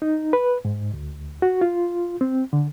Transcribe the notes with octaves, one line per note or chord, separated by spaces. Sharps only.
D#4
B4
G#2
D2
F#4
F4
C4
D3